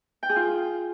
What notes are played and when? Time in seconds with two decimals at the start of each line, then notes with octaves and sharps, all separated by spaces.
0.23 G5
0.29 G#4
0.36 F4